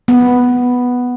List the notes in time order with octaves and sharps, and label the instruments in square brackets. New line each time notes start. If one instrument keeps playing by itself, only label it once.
[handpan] B3